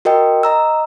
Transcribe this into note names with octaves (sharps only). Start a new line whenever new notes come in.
F#4 A#4 D#5 G5
D#5 A#5 E6